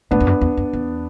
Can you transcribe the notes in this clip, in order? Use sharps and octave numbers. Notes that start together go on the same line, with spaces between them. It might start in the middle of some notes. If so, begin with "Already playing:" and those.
A2 B3 D4
E2
F#2
E2
F#2
E2